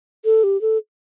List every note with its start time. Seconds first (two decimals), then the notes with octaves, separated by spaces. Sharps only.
0.25 A4
0.44 G4
0.61 A4